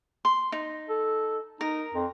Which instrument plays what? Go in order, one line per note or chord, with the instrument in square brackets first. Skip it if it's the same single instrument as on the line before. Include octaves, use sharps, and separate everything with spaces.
[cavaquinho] C6
D#4
[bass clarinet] A4
[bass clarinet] D#4 [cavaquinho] A#4
[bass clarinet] F2